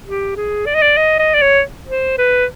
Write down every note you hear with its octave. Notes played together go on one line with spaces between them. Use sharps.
G4
G#4
D5
D#5
D5
D#5
D#5
D5
C#5
C5
B4